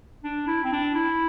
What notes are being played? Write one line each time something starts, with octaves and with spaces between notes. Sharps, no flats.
D4
E4
C4
D4
E4